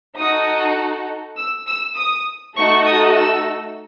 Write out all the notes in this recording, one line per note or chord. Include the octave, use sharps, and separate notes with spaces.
D#4 F#4 A4 D#6
E6
E6
D#6
A3 D#4 F#4 A4 C#6
D#6
E6